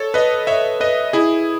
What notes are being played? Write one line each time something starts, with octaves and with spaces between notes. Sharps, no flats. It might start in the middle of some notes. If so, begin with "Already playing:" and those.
Already playing: A4 C#5
B4 D#5
C#5 E5
B4 D#5
E4 G#4